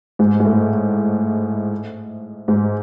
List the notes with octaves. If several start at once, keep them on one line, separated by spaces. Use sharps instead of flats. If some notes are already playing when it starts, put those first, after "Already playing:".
G#2
G#2
A2
G#2